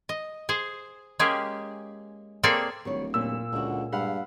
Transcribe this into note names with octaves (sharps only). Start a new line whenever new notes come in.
D#5
G#4 C5
G#3 A#3 C#4 G4 G#4
A#3 C4 G#4 A4 C#5 D5
D1 D#3 G3 C#5
F2 A#2 G3 C#4 E6
C#2 D3 F#4
G2 G#3 F5 F#5 B5